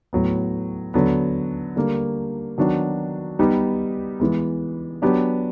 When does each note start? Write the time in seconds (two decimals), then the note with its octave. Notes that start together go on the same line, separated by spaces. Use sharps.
0.13 A2 F#3 B3
0.94 D3 F#3 B3
1.76 D3 G3 A#3
2.58 D#3 F#3 B3 D4 F#4
3.39 G3 B3 D#4 G4
4.20 E3 G#3 B3
5.02 F#3 B3 D4 G4